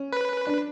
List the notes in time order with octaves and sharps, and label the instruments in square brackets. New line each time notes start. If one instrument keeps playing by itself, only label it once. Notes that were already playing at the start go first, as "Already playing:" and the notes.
Already playing: [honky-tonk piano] C#4
[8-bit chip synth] B4
[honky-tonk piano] D4